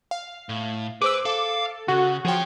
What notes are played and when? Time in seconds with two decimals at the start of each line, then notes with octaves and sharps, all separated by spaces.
0.11 F5
0.49 A2
1.02 G#4 B4 C5 D6 E6
1.25 A4 F5
1.88 C#3 F#4
2.25 F3 G#4 C#5 G5